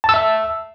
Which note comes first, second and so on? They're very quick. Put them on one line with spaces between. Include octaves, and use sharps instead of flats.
A5 E6 E5